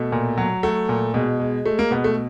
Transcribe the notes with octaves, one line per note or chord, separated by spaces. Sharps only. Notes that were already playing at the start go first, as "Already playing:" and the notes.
Already playing: B2 A3
A#2
F#3
F#3 A3
A#2
B2 G#3
G#3
G#3 A3
A#3
B2 B3
A3